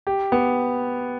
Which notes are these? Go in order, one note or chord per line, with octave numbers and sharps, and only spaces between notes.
G4
B3